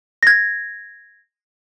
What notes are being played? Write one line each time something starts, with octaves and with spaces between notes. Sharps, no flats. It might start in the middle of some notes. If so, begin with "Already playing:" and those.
G#6 A#6